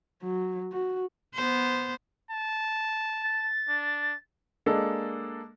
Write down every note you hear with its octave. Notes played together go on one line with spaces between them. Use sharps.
F#3
F#4
B3 C5
A5
A6
D4
G#3 A#3 D4 A4